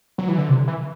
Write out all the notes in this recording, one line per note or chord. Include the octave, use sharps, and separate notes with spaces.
F#3
E3
D3
C3
E3